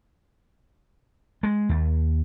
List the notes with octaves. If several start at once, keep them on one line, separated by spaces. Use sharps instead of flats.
G#3
D#2